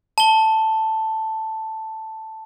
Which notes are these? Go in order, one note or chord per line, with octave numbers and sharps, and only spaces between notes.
A5 G7